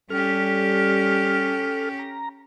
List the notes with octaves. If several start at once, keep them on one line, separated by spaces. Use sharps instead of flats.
G3 C#4 G4 A4 F6
A#5